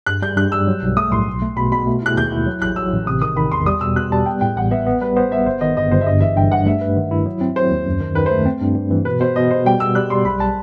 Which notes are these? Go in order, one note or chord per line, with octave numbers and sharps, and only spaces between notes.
G2 F#6
G3 G6
G2 F#6
G3 E6
F#3
B1
A3 D#6
A2 C6
B1
A3
B2 B5
B2 B5
A3
E4 F#6
D#2 G6
E4
F#3
A1 F#6
F#3 E6
A1
C3 D#6
D#3 D#6
D#3 B5
E2 C6
G3 D#6
B2 E6
B2 F#6
G3 A5
B3 G5
A2 G5
A1 F#5
B3 E5
B3
G3 B4
B3 C5
B3 E5
G1 C5
D#3 D#5
G1 D#5
G1 C5
E5
G2 D#5
E3 E5
G2 G5
G2 F#5
A3 E5
B4
D#3
E4
F#3
C4
F#3 C5
D#2
F#2
D#3
D#3 B4
C5
A3
C4
G2
G2
E3
B2 B4
B2 C5
B2 D#5
B2 C5
G3 G5
B3 E6
G3 F#6
G3 C6
B1 B5
A5